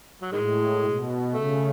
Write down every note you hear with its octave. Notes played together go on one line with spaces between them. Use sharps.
F#3
A2 D#3 G#3
B2
C#3 A3